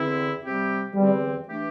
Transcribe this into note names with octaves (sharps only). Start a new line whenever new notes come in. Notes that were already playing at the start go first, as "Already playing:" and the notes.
Already playing: E2 D3 C4 E4
C3 G3 C4 G4
E2 D3 G3 C4 G4
E3 A3 D4 G4